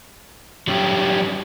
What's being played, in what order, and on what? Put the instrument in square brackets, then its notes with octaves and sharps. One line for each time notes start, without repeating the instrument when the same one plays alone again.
[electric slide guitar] F#3 G3 C#4 F#4 G4